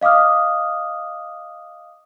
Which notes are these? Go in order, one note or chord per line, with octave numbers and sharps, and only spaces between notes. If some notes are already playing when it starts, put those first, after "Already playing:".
D#5 F5 D6 D#6 F6